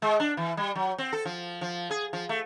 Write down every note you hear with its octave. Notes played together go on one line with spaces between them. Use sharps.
G#3
D4
E3
G3
F#3
C4
A4
F3
F3
G#4
F3
A3